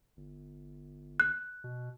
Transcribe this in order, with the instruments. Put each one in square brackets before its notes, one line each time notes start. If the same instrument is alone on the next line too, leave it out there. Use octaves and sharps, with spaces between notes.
[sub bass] G1
[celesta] F#6
[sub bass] B2